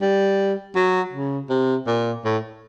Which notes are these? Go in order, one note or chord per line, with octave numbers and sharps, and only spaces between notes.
G3
F#3
C#3
C3
A#2
A2